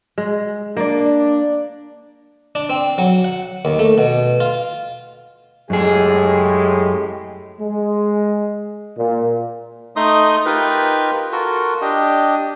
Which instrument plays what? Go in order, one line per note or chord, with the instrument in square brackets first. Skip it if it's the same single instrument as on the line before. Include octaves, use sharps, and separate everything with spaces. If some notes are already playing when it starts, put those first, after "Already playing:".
[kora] G#3
[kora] A#3 D5 [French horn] D4
[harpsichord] D4
C4
F#3
F#5
D#2
A3
B2
F4
[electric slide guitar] F#2 G#4 [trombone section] A2 G#3 G4
[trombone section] G#3
A#2
[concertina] A3 D#4 D#5 C6 D#6
D#4 F4 G4 A#4 B4
F4 F#4 A4 A#4
D4 G4 D#5